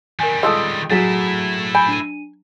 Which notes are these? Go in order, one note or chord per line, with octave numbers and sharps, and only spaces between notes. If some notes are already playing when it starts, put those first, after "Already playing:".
D#3 G3 A#4 G#5
G#3 F4 A4 C6 D#6 E6
F#3 A3 E4 G#4 A6 B6
G#5 B5 G6 D7
D4 D#7